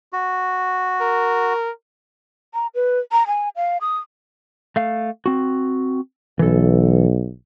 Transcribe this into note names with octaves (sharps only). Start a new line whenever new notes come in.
F#4
A#4
A#5
B4
A#5
G#5
F5
D#6
A3 F5
C4 F#4
B1 E3 A4